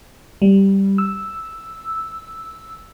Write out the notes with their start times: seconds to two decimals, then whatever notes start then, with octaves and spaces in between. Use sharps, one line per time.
0.42 G3
0.98 E6